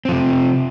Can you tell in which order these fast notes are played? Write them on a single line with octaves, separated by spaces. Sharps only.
C4 F3 C3